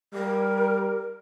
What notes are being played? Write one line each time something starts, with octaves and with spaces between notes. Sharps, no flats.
G3 A#4